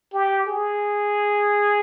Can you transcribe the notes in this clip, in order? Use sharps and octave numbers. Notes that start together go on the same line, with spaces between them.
G4
G#4